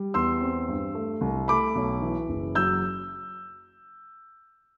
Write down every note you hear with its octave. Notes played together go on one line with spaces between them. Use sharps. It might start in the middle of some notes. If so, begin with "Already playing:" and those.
Already playing: G3
E2 C6 E6
C4
G2
A3
C2
A3 B5 D6
B1
E3
F#1
F#3 E6 G6